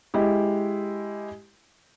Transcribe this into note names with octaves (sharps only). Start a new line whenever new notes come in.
G#3 E4 G4